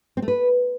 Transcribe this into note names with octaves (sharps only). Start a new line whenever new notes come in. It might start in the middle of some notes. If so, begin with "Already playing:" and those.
C4
A3
B4